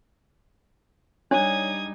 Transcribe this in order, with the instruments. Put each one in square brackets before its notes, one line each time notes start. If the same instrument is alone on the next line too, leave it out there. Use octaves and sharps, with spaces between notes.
[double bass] G3 D#4 [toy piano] D4 [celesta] C#5 [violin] D#6 G#6